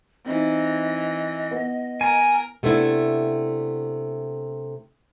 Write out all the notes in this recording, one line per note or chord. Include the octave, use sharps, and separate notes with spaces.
E3 C4 D#4 D#5
B3
A#4 G#5
C3 A3 B3 D4 E4